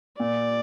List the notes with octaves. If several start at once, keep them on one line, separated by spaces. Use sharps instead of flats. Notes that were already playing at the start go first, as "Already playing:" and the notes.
A#2 D5